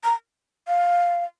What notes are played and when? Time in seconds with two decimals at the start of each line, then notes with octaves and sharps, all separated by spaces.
0.04 A#5
0.68 F5